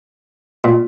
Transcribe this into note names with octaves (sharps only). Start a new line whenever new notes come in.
A#2